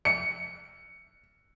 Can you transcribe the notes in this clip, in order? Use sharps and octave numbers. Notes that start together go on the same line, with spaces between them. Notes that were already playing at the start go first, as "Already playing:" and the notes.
C#7